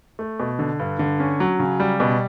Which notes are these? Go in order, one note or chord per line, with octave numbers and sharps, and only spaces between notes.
A3
B2
D3
G2
D3
C#4
F#3
C#3
G3
B2